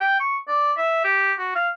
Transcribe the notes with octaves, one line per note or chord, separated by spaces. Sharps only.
G5
C#6
D5
E5
G4
F#4
F5